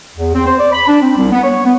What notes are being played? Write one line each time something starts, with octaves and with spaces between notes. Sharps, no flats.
E2
C4
C5
D5
B5
D4
C4
C2
B3
C#5
B3